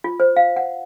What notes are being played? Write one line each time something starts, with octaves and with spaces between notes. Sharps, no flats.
F4
C5
F5
F#5